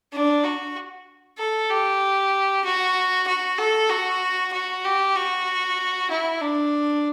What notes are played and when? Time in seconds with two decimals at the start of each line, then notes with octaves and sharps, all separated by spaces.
0.12 D4
0.44 F#4
1.38 A4
1.70 G4
2.64 F#4
3.27 F#4
3.58 A4
3.89 F#4
4.53 F#4
4.84 G4
5.16 F#4
6.10 E4
6.41 D4